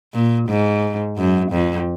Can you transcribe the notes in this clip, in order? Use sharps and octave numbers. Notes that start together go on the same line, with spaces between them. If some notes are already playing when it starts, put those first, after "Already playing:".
A#2
G#2
F#2
F2